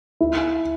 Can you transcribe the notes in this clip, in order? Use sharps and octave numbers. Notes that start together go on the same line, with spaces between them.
E4